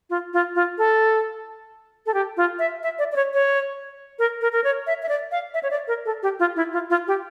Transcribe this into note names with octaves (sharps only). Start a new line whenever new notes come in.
F4
F4
F4
A4
A4
G4
F4
E5
E5
D5
D5
C#5
C#5
A#4
A#4
A#4
C#5
E5
E5
D5
F5
E5
C#5
D5
A#4
A4
G4
F4
E4
F4
F4
G4